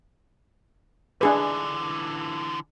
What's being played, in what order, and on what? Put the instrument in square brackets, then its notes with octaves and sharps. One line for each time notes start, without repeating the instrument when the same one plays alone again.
[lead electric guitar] D3 E3 [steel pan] D4 G#4 B4